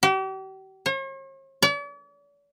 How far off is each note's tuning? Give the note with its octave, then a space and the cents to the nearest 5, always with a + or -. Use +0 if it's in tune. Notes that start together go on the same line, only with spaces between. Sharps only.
G4 -40
C#5 -45
D5 -45